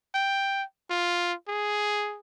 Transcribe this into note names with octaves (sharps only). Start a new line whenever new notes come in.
G5
F4
G#4